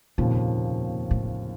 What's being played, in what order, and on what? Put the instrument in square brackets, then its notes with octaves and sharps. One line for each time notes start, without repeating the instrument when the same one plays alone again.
[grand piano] F1 D#2 C#3 F3 [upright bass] A#2
[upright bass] A2